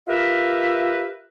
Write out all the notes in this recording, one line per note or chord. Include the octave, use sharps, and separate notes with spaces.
F4 G4 A#4 B4 E5